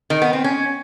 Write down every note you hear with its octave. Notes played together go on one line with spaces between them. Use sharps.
D#3
B3
C4
C#4